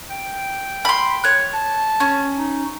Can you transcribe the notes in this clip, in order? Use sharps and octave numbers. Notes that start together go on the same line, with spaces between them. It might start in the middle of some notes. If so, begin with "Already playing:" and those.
G5
B5 C6
C#5 F#6
A5
C#4
D#4